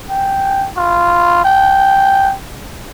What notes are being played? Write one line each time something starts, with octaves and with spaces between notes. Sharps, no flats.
G5
F4
G5